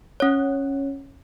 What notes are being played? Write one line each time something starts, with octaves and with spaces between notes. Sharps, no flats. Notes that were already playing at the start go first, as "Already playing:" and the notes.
C#4 C#5